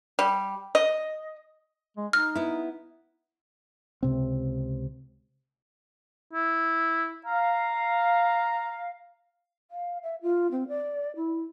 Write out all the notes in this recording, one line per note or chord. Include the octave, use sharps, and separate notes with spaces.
G3
D#5
G#3
D#4 F6
B3 E4
C#2 C3 C4
E4
F5 A#5
F5
E5
F4
C4
D5
E4